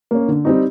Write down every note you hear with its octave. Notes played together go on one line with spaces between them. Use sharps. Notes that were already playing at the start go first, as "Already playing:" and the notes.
A#3 C#4
D3
G3 C4 D#4